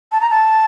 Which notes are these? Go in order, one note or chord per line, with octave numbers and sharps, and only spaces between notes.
A5
A#5
A5